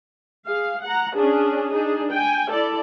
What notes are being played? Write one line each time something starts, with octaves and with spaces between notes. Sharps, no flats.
G#4 F5
F#5 A#5
C#4 D4 G#4
D4 D#4 G#4
G5 G#5
E4 A4 D5